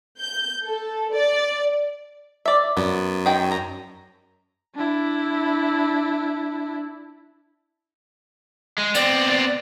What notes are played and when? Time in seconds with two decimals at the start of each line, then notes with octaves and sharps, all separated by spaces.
0.19 G6
0.65 A4
1.14 D5
2.46 D5 E5
2.77 F#2 B3
3.26 D#3 G#4 G5
3.51 A#5
4.75 D4 E4
8.78 G#3
8.95 B3 C4 D5